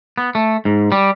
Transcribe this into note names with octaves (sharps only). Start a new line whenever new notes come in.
B3
A3
G#2
G3